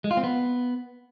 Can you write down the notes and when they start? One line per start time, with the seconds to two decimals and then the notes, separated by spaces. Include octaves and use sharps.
0.04 G#3
0.11 F4
0.17 C4
0.24 B3